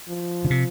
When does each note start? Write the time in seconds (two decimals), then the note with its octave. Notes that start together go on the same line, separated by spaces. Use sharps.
0.08 F3
0.45 D3
0.50 C3